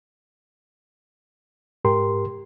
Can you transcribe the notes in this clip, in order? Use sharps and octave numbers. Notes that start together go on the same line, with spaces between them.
G#2 G4 A#4 C6